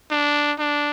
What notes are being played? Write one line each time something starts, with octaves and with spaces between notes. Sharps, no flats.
D4
D4